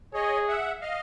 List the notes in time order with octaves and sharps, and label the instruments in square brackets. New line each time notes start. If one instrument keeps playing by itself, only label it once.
[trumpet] G#4 [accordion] C#5 D#5
[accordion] E5 F#5
D#5 F5